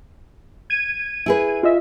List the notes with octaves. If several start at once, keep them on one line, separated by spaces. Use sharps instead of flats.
G#6 D#7
E4 G#4 B4
F4 D#5 E5